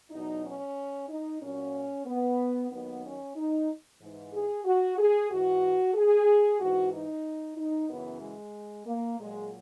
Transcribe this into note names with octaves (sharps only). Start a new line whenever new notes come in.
E2 B2 F#3 D#4
C#4
D#4
A#2 F#3 C#4
B3
D#2 D#3 F#3 B3
C#4
D#4
G#2 E3
G#4
F#4
G#4
G#2 E3 F#4
G#4
G#2 E3 F#4
D#4
D#4
F#2 C#3 E3 B3
G#3
A#3
A#2 F#3 G#3